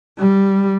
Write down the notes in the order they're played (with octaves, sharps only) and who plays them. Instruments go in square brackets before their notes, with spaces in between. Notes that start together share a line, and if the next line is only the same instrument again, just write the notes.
[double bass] G3